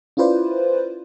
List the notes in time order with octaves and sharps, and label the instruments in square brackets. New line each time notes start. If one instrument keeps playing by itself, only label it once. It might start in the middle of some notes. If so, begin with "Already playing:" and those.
[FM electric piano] C#4 E4 F4 B4 C5 D5